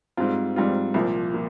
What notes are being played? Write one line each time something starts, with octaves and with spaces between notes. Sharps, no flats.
G#2 G3 C4 F4
G#2 G3 C4 F4
C2 A#2 F3
A#2